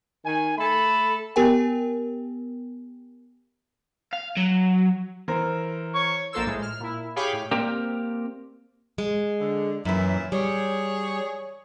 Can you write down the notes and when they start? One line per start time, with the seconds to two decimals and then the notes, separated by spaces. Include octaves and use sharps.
0.24 D#3 G#5
0.57 A3 A4 B5
1.36 B3 G4 A#4 G5 G#5
4.13 F5
4.37 F#3
5.28 E3 A#4 C5
5.95 C#5 C#6
6.33 A#1 A#3 F4 A4 C5 E6
6.46 A2 G#3
6.62 F6
6.80 A#2 E4
7.16 G4 G#4 C#5 F5 G5 B5
7.33 A2
7.51 A#3 C4 G4 A#4 D5 G5
8.98 G#3
9.40 D3
9.85 F#2 A#2 E3 C#4 E4
10.32 G3 G#4 C#5